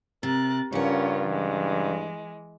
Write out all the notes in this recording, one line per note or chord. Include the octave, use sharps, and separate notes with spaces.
C3 A#4 F#6 A6
G2 C#3 C#4 F4 A#4 F#5
E3 G#3